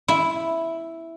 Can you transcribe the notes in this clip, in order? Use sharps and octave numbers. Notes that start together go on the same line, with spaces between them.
E4